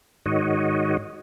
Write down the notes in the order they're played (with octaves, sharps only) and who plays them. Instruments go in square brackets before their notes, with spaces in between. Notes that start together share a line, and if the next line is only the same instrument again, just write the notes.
[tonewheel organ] G#2 D#3 F#4 C#5 D#5